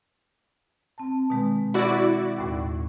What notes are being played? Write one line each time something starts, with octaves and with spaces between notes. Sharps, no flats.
C4 A5
B2 D#3 G#3
E4 F#4 D5
D#2 A2